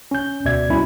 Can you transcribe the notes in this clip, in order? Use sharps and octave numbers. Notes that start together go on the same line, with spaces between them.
C#4 G6
D2 B2 D5 E5 G#6
B2 G3 C#4 E4